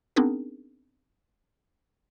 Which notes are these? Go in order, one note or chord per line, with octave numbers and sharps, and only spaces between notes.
B3 C4 D4 D#4 G#4 A#4